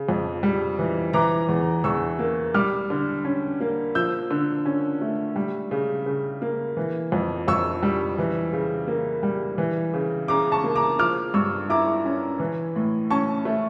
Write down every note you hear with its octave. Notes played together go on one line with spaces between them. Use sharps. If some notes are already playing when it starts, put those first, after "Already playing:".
Already playing: C#3
F2
G3
E3
E3 A#5 D6
E2
E2 C#6 E6
A#3
G3 D6 F6
D3
C#4
A#3
F3 E6 G6
D3
C#4
A3
G3
C#3
C#3
A#3
E3
F2
F2 C#6 E6
G3
E3
C#3
A#3
G3
E3
C#3
C#3 A#5 D6
A5 C#6
A#3
A#5 D6
F3 D6 F6
G2 C#6 E6
E4 A#5 D6
C#4
E3
A2
C#4 A5 C#6
A3